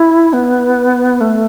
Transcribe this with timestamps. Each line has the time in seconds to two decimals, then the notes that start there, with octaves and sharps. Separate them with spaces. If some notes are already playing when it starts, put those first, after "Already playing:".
Already playing: E4
0.33 B3
1.21 A3